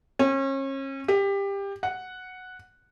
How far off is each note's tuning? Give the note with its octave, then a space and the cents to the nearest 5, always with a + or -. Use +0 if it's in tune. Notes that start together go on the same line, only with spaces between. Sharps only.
C#4 -35
G4 +20
F#5 -5